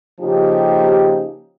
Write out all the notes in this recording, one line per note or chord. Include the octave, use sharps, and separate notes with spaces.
C#3 F3 A#3 D#4 G4